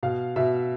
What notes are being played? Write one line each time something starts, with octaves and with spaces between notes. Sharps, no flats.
B2 F5
B2 E5